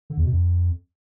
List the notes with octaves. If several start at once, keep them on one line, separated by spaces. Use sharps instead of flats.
D3
E2
B2
F2